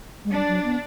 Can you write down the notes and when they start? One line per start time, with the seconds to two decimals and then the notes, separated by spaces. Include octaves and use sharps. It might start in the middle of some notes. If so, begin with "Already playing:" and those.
0.25 G#3
0.30 G3 D4
0.48 F#3
0.64 B3